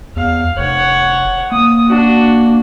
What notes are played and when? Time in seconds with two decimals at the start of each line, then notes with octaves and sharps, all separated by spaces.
0.16 E2 F5
0.58 F1 C#5 F#5
1.52 A#3 D#6
1.87 D4 F#4